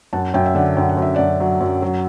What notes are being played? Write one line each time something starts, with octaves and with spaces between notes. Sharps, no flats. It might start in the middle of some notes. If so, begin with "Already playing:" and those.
F#2 F#5 A5
F#2 E5 G5
E5
D3 D5 F#5
F#2 G5
F#5
F#2
E5
F#2 D5 F#5
F#3
F#2
F#3